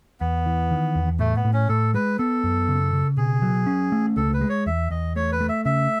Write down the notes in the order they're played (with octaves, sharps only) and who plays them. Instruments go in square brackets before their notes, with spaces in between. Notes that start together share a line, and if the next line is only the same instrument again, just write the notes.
[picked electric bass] E2 [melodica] B3
[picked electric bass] E3
D#3
E2
[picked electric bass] A2 [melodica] A3
[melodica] B3
[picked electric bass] A2
[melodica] C#4
[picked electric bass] A2 [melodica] A4
[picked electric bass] G#3 [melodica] B4
[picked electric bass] B3 [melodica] A4
[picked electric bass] F#2
C#3
C#3
[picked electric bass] B2 [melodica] G#4
[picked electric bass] F#3
C#4
A3
[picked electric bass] C#2 [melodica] A4
[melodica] B4
[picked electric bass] G#3
[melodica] C#5
[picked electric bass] E2 [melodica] E5
[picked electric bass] E2 [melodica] D#5
[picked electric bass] A3 [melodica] C#5
[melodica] B4
[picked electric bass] A3
[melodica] E5
[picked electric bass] C#3 [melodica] E5